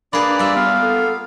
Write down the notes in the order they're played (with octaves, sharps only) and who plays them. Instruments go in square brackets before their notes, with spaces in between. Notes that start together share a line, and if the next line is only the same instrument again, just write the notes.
[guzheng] A#3 G#4 [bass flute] D4 [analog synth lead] B4 [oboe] D5
[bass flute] G3 [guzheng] F4 E5
[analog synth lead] B3 [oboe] F5
[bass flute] A4